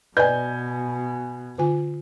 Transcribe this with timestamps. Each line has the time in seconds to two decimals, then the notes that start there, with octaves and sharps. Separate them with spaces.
0.17 B2 B4 D5 D#5 G#5 G6
1.58 D3 F4 G#5